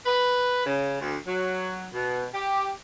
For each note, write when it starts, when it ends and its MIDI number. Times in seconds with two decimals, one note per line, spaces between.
0.06 0.62 71
0.66 0.98 49
1.00 1.17 38
1.26 1.87 54
1.93 2.26 47
2.34 2.70 67